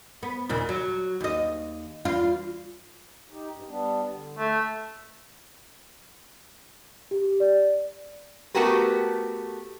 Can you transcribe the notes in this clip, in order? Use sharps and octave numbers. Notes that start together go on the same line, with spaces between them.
B3
D#2 A#2 C#3
F#3
D#2 D#5
E2 F4
D#4 G4
G2
G3 B3 D4
D3
A3
G4
D5
A3 B3 F#4 G4 A#4 B4